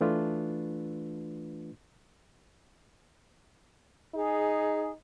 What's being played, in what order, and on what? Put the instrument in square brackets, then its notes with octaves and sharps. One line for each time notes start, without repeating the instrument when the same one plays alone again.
[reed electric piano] E3 A3 D4 F4 B4
[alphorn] D#4 [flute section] G#4